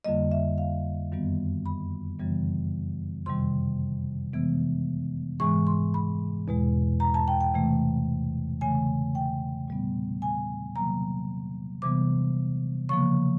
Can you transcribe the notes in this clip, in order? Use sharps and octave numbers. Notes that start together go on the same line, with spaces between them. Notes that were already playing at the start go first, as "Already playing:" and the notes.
F2 D3 G3 A#3 D#5
E5
F5
F#2 D#3 G3 B3
B5
F#2 C#3 E3 G3 B3
F2 C3 D#3 G3 C6
C3 E3 G#3 B3
G#2 E3 G#3 C#6
C6
B5
E2 B2 G#3
A#5
A5
G5
G5
C3 E3 A3
C#3 E3 A3 G#5
G5
A#2 G3 B3
G#5
C3 D#3 F#3 A#3 A#5
C3 E3 G3 B3 D6
C#3 F3 A#3 C#6